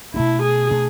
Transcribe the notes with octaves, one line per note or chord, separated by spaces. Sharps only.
B2 A3 D4 E4
G#4
B2 A3 D4